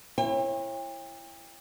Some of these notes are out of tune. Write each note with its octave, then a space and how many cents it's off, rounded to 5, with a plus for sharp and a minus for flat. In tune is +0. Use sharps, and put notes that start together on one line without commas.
E4 +15 C#5 -35 G5 +35